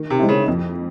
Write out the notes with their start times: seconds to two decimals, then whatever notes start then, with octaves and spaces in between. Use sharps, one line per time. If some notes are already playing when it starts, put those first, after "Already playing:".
Already playing: D#3
0.10 C3
0.19 G#3 C4 E4
0.29 C#3
0.48 F2